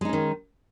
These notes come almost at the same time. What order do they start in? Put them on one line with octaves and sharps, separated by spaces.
G#3 D#4 C#4 D#3